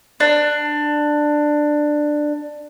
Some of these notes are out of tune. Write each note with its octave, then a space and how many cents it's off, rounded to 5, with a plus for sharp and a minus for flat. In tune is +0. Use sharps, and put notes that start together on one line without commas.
D4 +15